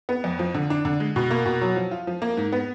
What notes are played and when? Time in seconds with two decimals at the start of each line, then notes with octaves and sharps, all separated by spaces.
0.09 B3
0.24 F2
0.39 F3
0.54 D3
0.70 D4
0.85 D3
1.00 G#3
1.16 B2
1.31 A#3
1.46 B2
1.61 F#3
1.76 F3
1.91 F4
2.07 F3
2.22 A#3
2.37 G#2
2.52 B3